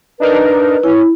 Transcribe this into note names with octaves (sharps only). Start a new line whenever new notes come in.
D4 D#4 A#4 B4
C#4 E4